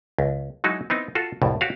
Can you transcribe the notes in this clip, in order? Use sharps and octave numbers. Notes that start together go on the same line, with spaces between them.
C#2
F#3 G#3 D#4 E4 F#4
B3 C4 D#4 E4
F4 F#4 A4
C2 F2 A2
F#4 G4 C#5 F5